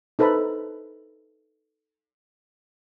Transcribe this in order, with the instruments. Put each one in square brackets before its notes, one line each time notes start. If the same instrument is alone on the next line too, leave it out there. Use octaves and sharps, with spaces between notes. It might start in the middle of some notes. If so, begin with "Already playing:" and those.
[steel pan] D#4 A4 B4 C5 A5 B5